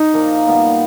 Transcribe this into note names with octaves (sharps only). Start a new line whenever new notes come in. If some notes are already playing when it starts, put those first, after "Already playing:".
Already playing: D#4
A#2 F3 A#3
A#2 G3 B3